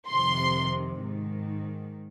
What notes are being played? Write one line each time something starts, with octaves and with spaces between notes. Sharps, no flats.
F2 C3 D#3 C6
G#2 D#3